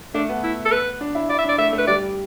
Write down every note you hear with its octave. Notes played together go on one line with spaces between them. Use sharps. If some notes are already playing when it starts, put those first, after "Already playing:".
A3 D4
B3
E4
A4
B4
D4
E4
E4 D5
E5
D4 D5
A3 E5
A3
B4
G3 D5